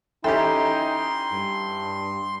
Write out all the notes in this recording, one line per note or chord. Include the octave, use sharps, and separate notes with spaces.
E3 C#4 D#4 G4 A4 E5 G5 C6
G2